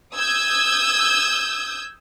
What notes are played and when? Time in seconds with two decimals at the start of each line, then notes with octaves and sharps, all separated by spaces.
0.15 D#6 E6 G6 G#6